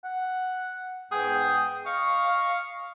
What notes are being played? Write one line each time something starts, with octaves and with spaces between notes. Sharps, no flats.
F#5
G#2 B3 G#4 G5
D#5 F5 C#6